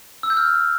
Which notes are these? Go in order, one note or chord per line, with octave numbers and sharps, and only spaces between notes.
E6
G6
F6